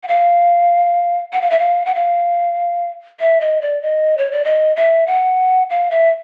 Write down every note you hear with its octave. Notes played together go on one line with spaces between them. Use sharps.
F#5
F5
F#5
F5
E5
F5
F#5
F5
E5
D#5
D5
D#5
C#5
D5
D#5
E5
F#5
F5
E5